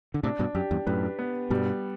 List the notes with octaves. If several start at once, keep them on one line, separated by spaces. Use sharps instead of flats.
D3
A2 C3 D4
G2 B2
F#2 G4
E2 G2
F#2 A2 B4
B3
G2 B2 G3